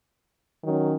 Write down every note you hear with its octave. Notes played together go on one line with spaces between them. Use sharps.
D#3 F#3 C#4